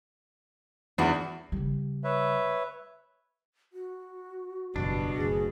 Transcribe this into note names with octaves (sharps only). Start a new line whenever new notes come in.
E2 D4 F#4
C#3 G3
B4 C#5 E5
F#4
F#1 E2 G2 B2 D4
F#1 D2 G#4